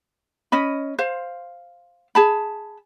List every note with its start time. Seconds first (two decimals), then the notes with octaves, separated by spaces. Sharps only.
0.52 C#4 D#5 B5
0.99 C5 F5
2.15 G#4 A5 B5